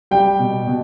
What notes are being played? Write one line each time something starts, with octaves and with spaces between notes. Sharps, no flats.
G3 G5
B2
B2